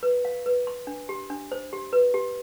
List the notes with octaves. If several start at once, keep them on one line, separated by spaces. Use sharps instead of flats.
B4
F5
B4
C6
D4
G4
D4
C5
G4
B4
G4